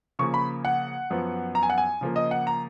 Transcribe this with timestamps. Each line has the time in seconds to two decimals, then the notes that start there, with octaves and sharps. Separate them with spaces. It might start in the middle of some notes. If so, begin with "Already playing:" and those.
0.19 C#3 F3 A#3 C#6
0.34 B5
0.65 F#5
1.10 F#2 F3 B3
1.55 A#5
1.63 G#5
1.70 F#5
1.78 G#5
2.01 C#3 F3 A#3
2.16 D#5
2.31 F#5
2.47 A#5